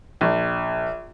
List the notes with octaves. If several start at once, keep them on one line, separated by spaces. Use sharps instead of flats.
A#1